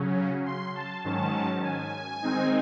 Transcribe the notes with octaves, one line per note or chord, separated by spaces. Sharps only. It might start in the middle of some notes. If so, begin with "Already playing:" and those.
Already playing: C#3 F#3 C#4
C6
A5
G#2 D#3 F#3 C#4 A5
G#5
D#3 G#3 C4 D#4